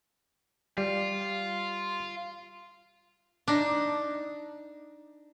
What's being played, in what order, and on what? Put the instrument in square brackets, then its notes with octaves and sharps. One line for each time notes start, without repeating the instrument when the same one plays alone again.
[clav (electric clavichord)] G3 [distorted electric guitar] F4
[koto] D4 D#4